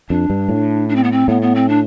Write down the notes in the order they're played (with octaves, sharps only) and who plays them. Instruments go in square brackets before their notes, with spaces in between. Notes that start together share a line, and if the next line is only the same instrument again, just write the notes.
[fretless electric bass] F2 [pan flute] D4
[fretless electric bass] G2
A2
[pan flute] D4
C4
B3
C4
[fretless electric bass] A2 [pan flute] B3
[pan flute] B3
C4
D4